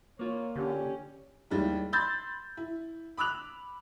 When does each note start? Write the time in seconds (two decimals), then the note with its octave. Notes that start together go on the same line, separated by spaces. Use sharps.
0.19 A#3 F4 C#5
0.56 D3 C#4 G4
1.50 D#2 G3 G#3 E4
1.93 B5 C6 E6 G6 A6
2.57 E4
3.17 B5 D6 E6 F#6 F7